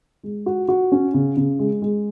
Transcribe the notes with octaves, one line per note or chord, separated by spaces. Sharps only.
G#3
F#4
F#4
C#4
C#3
C#3
G#3
G#3